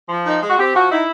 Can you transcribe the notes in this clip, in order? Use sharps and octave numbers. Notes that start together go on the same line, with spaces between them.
F3
D#4
G#3
F#4
C4 G4
F3 F#4
D#4 E4